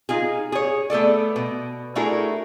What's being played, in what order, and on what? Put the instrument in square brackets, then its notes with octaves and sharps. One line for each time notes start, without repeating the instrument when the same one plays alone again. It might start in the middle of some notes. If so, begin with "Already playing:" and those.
[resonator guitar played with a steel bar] D#4 F4 G#4
G#4 C#5
A3 B3 A4 D5
B2
A3 D4 E4 F#4 G#4 A#4